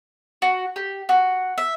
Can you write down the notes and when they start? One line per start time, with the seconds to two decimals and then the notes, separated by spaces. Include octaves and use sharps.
0.42 F#4
0.76 G4
1.09 F#4
1.58 E5